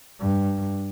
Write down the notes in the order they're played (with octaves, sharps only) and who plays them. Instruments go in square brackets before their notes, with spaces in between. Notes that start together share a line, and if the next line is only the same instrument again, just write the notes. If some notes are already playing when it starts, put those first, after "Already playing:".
[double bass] G2